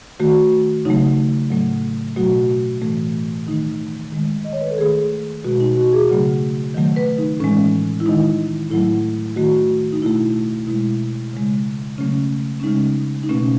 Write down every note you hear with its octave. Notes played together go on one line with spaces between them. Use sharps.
D#3 A3 F#4
C#3 F#3 A3 D#4
A2 F#3 A3
B2 F#3 A3 F#4
A2 E3 A3
D#3 A3 D#4
D#3 G#3
D#5
C#5
B4
A4
D#3 A3 G#4
B2 G#3 F#4
D#4
F#4
G#4
C#3 F#3 A3
D#3 F#3 A3
B4
D#4
A2 E3 G#3 C#4
E4
D#3 G#3 D#4
A2 F#3 A3 E4
D#3 A3 F#4
D#4
B2 A3 E4
B2 G#3 E4
C#3 G#3
C#3 F#3 A3 C#4
C#4
C#3 G#3 D#4
D#4
B2 A3 C#4